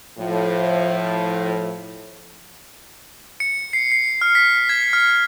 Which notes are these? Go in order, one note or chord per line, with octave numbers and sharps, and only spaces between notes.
A2 F3
C#7
C7
C7
F6
B6
G#6
F6